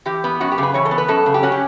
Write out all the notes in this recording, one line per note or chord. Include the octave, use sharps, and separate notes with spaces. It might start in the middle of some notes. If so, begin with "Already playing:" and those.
E3 G4
B3
F#2 F#4
G4
C#3
B4
E3 C#5
A4
B3
B4
F#2 A4
C#3
G4
C#4 F#4
G4